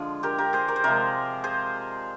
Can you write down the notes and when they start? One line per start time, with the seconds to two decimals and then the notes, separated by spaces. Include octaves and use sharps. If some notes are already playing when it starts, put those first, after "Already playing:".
Already playing: D3 F3 G#3 F4 G#4
0.23 G4 A#4
0.38 G4 A#4
0.53 G#4 C5
0.68 A#4 D5
0.76 C5
0.84 C3 F3 G#3 A#4 D5
1.44 G#4 C5